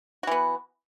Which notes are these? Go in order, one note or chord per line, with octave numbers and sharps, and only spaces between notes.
E3 B3 F#4